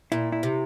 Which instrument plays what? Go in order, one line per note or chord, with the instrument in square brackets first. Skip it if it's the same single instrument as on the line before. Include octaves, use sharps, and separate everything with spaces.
[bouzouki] A#2 [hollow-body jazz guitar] E4
[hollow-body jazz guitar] E4
[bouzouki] C3